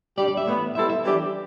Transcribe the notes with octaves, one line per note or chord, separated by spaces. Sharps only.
G3 D4 G4 D5
D5
E5
A2 E3 B3
G3 B3 E4 A4 C5 E5
E5
E3 G3 D4 G4